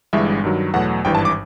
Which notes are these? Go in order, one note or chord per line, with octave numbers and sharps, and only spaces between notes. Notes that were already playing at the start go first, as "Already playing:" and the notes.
G1 G2 E3 G#3 E5
G2 D#3 F#3
E2 B2 F#3 A3 F#5
G#1 G2 E3 G5
A5
D6